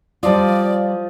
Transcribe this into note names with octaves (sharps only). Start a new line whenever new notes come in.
F3 G3 F4 D5 D#5